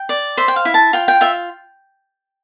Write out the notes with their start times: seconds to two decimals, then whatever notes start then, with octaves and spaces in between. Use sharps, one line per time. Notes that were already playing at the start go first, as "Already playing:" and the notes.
Already playing: G5
0.09 D5
0.37 C5 E5
0.48 G5
0.56 F5
0.65 E4
0.74 A5
0.93 F4 G5
1.08 G5
1.21 F4 E5